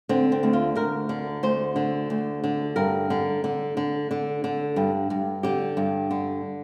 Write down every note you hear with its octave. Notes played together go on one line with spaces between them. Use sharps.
D3 C4
C4
D2
F4
D2 A#4
D3
D2 C5
D3
D2
D3
G2 A#4
D3
D3
D3
D3
D3
G2
G2
D3 G4
G2
D3